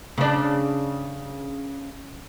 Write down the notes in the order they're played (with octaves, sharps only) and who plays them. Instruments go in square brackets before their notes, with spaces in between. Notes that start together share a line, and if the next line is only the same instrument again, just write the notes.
[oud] C#3 D4